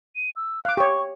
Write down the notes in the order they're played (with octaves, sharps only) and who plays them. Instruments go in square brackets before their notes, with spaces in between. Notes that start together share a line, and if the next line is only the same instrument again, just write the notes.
[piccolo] D#7
E6
[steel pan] F5 D6 [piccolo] F#6
[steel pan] G4 C#5 [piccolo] C#6